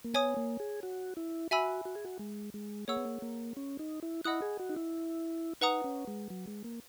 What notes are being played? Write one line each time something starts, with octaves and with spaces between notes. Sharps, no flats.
A#3
B3 C#5 G#5 D#6
A#3
G#4
F#4
E4
F#4 E5 G#5 B5 E6
F#4
G#4
F#4
G#3
G#3
A#3 G#4 C#5 F#5 C#6 E6
B3
A#3
A#3
C#4
D#4
E4
E4 D#5 F#5 B5 D#6 F#6
G#4
F#4
D#4
E4
D#4 B4 F#5 A#5 D#6
C#4
G#3
F#3
G#3
A#3